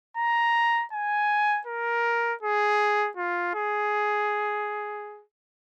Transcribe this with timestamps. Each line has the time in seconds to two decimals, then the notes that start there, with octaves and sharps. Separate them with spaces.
0.17 A#5
0.93 G#5
1.67 A#4
2.42 G#4
3.17 F4
3.55 G#4